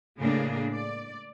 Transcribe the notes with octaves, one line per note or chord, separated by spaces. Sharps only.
A2 C#3 G#3 A#3 D4 G#4
D5